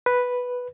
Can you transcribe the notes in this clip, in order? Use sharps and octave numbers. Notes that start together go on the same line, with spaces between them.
B4